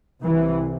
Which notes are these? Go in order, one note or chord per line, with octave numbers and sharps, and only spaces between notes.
C2 C3 E3